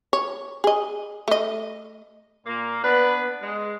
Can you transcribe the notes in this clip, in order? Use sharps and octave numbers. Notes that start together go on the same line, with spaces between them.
C#5
G#4 D#5
A3 D#5
A#2 A#3
B3 D4 B4
G#3